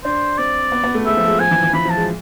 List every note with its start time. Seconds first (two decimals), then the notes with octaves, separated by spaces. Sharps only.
0.04 D4 C5
0.38 C4 D5
0.72 B3
0.84 B3
0.94 A3
1.06 G#3 E5
1.17 F3
1.27 G#3
1.40 F3 G#5
1.51 E3
1.62 E3
1.73 E3 B5
1.85 F3
1.90 A5
1.97 G#3